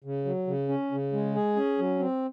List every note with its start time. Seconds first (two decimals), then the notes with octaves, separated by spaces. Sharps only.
0.04 C#3
0.25 F#3
0.47 C#3
0.69 C#4
0.92 C#3
1.12 G#3
1.35 G#4
1.56 C#4
1.79 F#3
2.00 C4